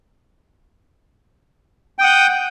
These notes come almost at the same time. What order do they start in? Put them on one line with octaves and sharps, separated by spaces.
G5 D#6 F#5 G6